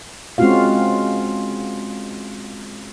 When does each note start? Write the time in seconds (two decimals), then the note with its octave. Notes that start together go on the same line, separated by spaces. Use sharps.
0.38 G#3 C4 C#4 F4 F#4 F5